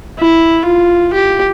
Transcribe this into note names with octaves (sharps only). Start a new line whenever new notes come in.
E4
F4
G4